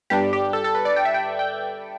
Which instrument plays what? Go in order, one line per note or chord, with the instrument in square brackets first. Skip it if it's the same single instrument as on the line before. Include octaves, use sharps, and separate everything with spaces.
[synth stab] G1 G2 G3 D4 G4
G4
A4
A4
B4
D5
G5
E5
G5
G5